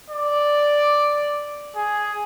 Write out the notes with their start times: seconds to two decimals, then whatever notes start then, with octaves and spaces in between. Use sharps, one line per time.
0.10 D5
1.76 G#4